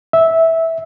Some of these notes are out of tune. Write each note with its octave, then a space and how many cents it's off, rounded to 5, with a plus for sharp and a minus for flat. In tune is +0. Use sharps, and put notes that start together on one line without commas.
E5 -10